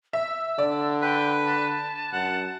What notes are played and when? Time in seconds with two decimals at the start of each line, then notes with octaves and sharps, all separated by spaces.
0.13 E5 E6
0.58 D3 D5
1.02 B4 G5
1.45 A5
2.13 F#2 F#5